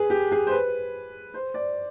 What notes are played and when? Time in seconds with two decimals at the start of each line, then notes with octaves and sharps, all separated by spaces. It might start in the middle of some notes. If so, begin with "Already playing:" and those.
Already playing: G#4 B4
0.10 G4
0.32 G#4
0.47 C5
0.51 B4
1.34 C5
1.54 D5